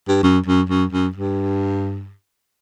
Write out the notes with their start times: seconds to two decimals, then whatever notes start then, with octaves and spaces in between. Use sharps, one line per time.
0.08 G2
0.23 F#2
0.46 F#2
0.69 F#2
0.92 F#2
1.15 G2